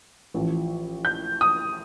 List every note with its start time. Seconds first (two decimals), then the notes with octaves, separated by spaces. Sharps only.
0.34 A1 A2 F3
1.05 G6
1.41 D#6